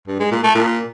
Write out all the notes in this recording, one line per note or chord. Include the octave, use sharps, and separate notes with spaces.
G2
G#3
A#2
A3
A#2